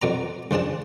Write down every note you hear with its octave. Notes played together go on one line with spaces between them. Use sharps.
F2 B2 D5 A#5
C#2 F3 D4 G#4 A5